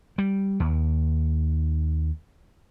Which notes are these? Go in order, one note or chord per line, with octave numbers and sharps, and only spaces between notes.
G3
D#2